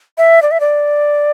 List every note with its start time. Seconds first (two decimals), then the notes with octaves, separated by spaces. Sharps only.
0.18 E5
0.42 D5
0.51 E5
0.60 D5